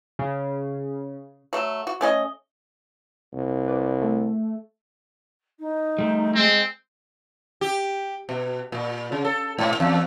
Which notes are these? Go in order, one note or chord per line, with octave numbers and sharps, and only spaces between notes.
C#3
F#3 A3
F#4
A3 C#4 G#4 D#5
C2
B4 D5
A3
D#4
G3 A3
G#3 C4
G4
B2
A#2
C#3
A4
G#2
E2